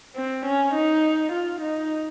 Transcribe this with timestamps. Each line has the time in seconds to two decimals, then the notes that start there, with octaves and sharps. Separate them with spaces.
0.16 C4
0.45 C#4
0.75 D#4
1.32 F4
1.61 D#4